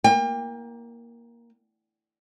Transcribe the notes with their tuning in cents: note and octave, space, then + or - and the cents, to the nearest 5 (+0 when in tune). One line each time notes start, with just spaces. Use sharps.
A#3 +10 G5 +40